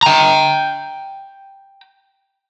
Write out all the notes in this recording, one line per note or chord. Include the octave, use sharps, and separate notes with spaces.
G5 A#5